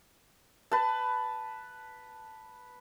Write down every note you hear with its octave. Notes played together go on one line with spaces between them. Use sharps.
B4 A5